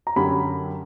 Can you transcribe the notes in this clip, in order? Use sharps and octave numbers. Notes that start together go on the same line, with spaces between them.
A#5
F#2 D3 F#3 C#4 G4 B5